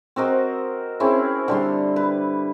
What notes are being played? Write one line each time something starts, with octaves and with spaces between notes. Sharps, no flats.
C4 F#4 A#4 D#5
C4 C#4 E4 G#4
D3 G3 C6
B4